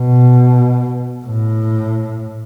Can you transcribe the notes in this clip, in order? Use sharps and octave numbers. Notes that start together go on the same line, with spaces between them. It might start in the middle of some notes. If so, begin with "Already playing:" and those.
Already playing: B2
A2